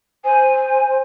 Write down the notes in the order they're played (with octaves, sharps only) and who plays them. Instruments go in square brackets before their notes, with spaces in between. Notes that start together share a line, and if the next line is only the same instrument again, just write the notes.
[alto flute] C5 [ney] G#5